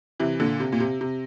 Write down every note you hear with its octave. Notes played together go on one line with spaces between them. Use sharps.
C3 E3
A#2 D3
C3
A#2
C3
C3